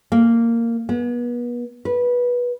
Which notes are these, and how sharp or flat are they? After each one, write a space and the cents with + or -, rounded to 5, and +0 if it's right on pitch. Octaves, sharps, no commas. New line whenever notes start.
A#3 -10
B3 -35
B4 -15